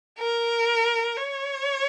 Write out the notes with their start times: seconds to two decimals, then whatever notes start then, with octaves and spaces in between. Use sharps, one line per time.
0.19 A#4
1.17 C#5